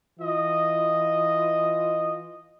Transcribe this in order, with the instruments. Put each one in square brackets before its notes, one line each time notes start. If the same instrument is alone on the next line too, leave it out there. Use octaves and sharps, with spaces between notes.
[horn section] E3 F4 D#5